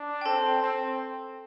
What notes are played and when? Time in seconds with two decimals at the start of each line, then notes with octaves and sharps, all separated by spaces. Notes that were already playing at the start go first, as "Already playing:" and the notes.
Already playing: D4
0.21 G5
0.25 C4 A4 A5
0.62 C4